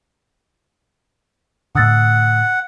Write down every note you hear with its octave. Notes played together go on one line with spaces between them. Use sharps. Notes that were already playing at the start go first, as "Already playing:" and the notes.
A2 D3 F#5 D#6 E6 A6